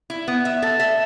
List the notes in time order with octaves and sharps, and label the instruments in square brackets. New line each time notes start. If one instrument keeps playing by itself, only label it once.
[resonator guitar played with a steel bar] E4
B3
E5
A4
E5